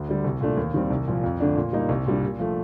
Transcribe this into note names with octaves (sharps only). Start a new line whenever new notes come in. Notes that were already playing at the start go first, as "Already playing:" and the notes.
Already playing: D2
D3 G3
C2
A#2 A3 D4
D#2
D#3 G3 C4
C2
A#2 F3
F2
D3 A3 D4
A#2
G3 A#3 D#4
C2
A#2 G3 D4
A#2
F3 A3